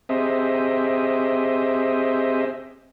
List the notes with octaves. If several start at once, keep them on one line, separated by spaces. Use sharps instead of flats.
C4 G4 G#4 C5 D#5 E5